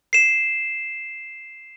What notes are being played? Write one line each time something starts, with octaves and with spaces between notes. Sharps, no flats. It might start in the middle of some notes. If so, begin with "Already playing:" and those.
C7 E7